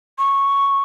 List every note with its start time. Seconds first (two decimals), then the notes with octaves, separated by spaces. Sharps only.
0.18 C#6